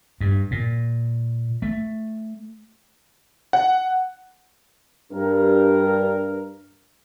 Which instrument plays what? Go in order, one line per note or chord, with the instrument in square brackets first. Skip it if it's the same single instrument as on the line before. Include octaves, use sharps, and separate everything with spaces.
[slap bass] G2
A#2
A3
[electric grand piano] F#5
[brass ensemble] G2 A#4